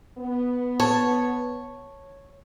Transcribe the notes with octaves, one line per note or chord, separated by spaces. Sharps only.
B3
C#5 A5